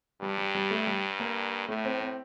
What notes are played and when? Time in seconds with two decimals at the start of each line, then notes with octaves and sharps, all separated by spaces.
0.22 G2 G3
0.38 G3
0.55 G3
0.71 A3
0.87 G3
1.20 A#3
1.68 A2 A3
1.85 C4
2.01 C4